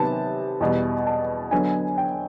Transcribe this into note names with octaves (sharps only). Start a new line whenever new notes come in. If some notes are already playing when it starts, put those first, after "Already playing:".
Already playing: C3 D#3 F#3 B3 A5
E2 B2 G3
A5
D3 F#3 B3 G#5
G5